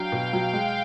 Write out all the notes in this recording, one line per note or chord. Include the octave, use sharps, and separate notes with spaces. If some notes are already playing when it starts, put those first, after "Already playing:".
Already playing: F#3 D4 F5 G5
B2
F#3
G#3